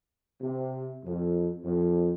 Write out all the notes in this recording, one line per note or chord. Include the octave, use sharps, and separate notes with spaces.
C3
F2
F2